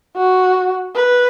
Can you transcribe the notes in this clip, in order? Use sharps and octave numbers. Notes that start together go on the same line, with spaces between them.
F#4
B4